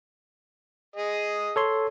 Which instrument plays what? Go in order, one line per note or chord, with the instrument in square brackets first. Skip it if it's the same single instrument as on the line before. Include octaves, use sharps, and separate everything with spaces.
[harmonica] G#4 D#5
[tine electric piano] A4 C#5 C6